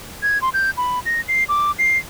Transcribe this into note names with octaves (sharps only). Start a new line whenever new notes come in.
G#6
C6
G6
B5
A#6
C7
D6
C7